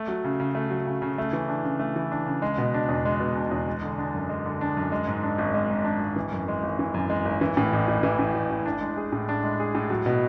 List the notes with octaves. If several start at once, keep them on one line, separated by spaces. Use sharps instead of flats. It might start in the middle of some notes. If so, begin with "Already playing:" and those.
Already playing: A3
F#3
C#3
C#3
A3
F#3
C#3
C#3
A3
E3
D4
C#3
A3
E3
D4
C#3
G#3
B2
D4
E2
G#3
B2
D4
E2
G#3
D3
D4
F#2
G#3
D3
D4
F#2
G#3
G#2
D4
G#1
G#3
G#2
D4
G#1
E3
F#2
G#3
G#1
E3
F#2
G#3
G#1
E3
A2
A1
A1
E3
A2
A1
A1
D4
G#3
G#4
A2
D4
G#3
G#4
A2
F#3
B2